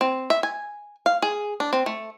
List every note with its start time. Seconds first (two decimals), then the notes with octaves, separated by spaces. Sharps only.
0.01 C4
0.30 E5
0.43 G#5
1.06 F5
1.22 G#4
1.60 D4
1.73 C4
1.86 A3